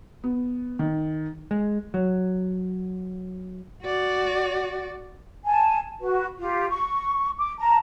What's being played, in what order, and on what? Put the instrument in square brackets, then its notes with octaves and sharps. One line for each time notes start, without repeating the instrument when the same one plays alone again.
[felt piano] B3
D#3
[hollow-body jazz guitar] G#3
F#3
[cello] F#4 D5
[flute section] G#5 A5
F#4 B4
F4 G4
C#6
D6
A5 A#5